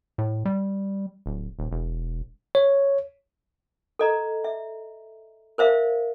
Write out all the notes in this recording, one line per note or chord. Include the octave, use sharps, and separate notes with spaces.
A2
G3
D1
D#1
E1
C#5
A4 D#5 A#5
E5
A#4 C5 E5 F5